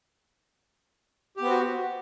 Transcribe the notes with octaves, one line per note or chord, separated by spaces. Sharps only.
B3 C4 F#4 G4